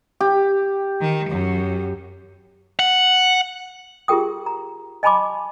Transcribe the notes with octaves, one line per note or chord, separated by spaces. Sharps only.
G4
D#3
F#2
F#5
F4 G4 G#4 A#4 G5 D#6
A#5
D#5 G#5 A5 B5 C6 D6